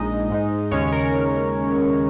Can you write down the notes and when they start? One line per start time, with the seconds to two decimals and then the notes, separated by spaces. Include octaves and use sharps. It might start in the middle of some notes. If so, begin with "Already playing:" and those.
Already playing: A#1 A#2 G#3 D#4 D#5
0.29 G#2 G#3 D#4
0.71 D#2 C#3 G#3 C#4 C#5
0.88 C#5
0.92 A#4